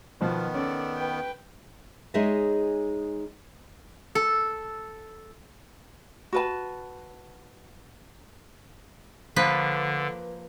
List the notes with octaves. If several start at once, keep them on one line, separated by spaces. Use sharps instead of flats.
B2 D#3 F3 B3
C#4 A4 D5
B4 G5
G#3 D#4 G#4 C#5 D#5 E5
A4
F#4 B4 A5
D3 F3 A#3 B4